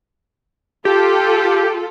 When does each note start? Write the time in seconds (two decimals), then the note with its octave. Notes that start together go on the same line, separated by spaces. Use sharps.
0.85 F4 G4 A4